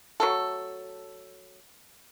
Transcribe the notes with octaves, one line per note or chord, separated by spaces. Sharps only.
F#3 A3 A4